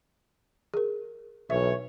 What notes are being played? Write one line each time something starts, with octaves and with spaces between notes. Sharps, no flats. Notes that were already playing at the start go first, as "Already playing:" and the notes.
G#4 A#4
B1 E3 C#5 E5